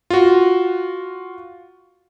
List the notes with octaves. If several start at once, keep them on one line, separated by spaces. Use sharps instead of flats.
F4 F#4